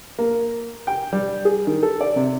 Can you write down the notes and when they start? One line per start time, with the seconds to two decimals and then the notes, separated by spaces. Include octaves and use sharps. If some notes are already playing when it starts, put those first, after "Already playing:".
0.19 A#3
0.87 G5
1.13 G3
1.45 G#4
1.67 D#3
1.83 A4
2.01 D5
2.16 C3